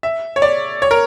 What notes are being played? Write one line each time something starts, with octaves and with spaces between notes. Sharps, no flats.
E5
C#5
D5
C#5
A#4